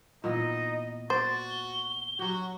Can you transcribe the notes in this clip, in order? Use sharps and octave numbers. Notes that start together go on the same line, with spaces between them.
A#2 E3 B3 D#4 D#5
F#4 C5 D5 A6
G7
F#3 F#4 G4